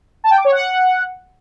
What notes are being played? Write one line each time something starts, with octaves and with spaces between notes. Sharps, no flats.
A5
G5
D6
C#5
F#5